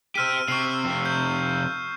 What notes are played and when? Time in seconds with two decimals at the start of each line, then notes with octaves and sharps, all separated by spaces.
0.15 G4 C5 E6 F6 D#7
0.48 C3 C#6 C7
0.85 F2 C3
1.05 G6